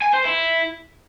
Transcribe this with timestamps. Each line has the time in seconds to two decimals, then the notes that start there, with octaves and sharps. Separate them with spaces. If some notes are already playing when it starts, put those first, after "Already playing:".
0.02 G#5
0.14 C5
0.25 E4